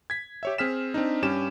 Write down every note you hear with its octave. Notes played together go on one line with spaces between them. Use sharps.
G#6 B6
G4 C#5 E5
C4 G#4 F6 B6 E7
C4 D4 D#4
G2 C#4 G4 E7